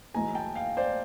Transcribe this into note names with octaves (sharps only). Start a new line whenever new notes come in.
B1 A2 E3 G#3 G#5 A#5
G5 A5
F5 G5
C5 D5